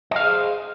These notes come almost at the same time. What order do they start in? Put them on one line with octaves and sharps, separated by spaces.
D#5 F5 G#4 C5